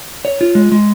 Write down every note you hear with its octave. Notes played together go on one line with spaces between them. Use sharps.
C#5
F4
G#3
G#3